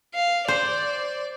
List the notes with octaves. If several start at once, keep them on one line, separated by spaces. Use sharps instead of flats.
F5
C5 D5